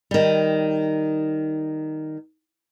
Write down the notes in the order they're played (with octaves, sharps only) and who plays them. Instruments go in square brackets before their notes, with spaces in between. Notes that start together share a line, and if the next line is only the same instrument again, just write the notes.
[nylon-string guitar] D#3 G3